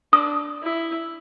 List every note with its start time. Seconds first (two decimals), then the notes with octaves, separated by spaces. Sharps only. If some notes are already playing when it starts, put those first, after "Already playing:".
0.13 D4 D#6
0.63 E4